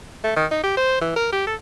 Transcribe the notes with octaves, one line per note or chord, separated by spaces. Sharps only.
A3
D#3
D#4
G4
C5
E3
A#4
G4
A4